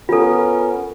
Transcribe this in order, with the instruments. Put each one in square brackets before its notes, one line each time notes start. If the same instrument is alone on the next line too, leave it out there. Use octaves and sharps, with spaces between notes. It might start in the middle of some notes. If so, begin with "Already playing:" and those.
[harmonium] B3 C#4 A#4 [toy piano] F4 A4